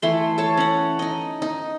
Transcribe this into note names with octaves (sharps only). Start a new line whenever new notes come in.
E3 A3 C6
A4 C#5 A5
C#4 F#5
D#4 D#5
D#4